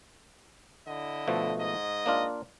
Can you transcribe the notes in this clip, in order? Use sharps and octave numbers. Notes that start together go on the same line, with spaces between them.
D3 E4 D#5
B2 F3 A3
G#2 D#5
A#3 D4 F4